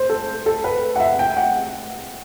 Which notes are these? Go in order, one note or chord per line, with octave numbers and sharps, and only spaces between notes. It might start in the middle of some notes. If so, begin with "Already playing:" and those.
Already playing: C5
A4
A4
B4
F#5
E5
G5
F#5